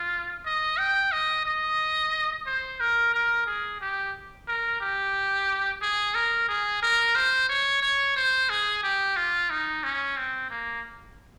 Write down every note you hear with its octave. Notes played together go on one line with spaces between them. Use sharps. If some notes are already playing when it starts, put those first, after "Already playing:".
Already playing: F4
D#5
G5
D#5
D#5
C5
A#4
A#4
G#4
G4
A#4
G4
G#4
A#4
G#4
A#4
C5
C#5
C#5
C5
G#4
G4
F4
D#4
C#4
C4
A#3